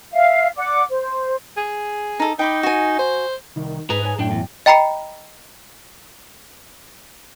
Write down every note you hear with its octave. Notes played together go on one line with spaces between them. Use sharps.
E5 F5
D5 F#5 D6
C5
G#4
D#4 A4
D#4 G5 B5 D6
F#4 G#5
C5
C2 D#3
G#2 G#4 B4 A#5
B4 C#5 G#5
F#2 A2 D4 G5
E2
D#5 G5 A#5 B5 C7 C#7